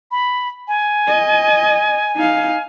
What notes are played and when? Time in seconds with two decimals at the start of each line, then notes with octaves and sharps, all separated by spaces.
0.11 B5
0.68 G#5
1.07 D#5
2.16 D#4 F5